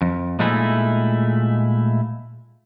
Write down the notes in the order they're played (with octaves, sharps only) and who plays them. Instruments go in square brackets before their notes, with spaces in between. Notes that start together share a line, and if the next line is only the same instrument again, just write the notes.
[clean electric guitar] F2
A#2 G#3 A3 D#4 E4